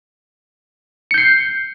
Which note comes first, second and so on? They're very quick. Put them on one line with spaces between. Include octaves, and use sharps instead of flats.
C#7 G6 C7